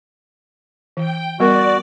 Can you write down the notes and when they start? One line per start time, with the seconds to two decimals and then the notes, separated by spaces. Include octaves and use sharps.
0.97 E3 G5
1.40 G3 B3 F#4 A#4 D5